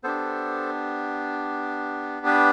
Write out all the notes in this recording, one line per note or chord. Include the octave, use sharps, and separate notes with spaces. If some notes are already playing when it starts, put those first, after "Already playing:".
B3 D4 G4 A4 C5
B4